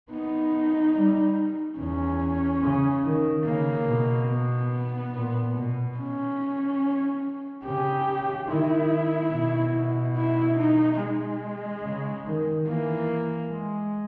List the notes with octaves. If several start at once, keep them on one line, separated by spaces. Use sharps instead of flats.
B3 D#4
G3
E2 C#4
C#3
D#3
C#3 A#3
B2
B3
A#2
B2
C#4
C#3 G4
D#3 E4
B2
E4
D#4
G#3
C#3
D#3
E3 A#3
G#3